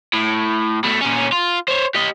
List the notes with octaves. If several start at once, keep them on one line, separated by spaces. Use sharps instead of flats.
A2
B2 A3
A#2 C#4
F4
C5 C#5
G4 D#5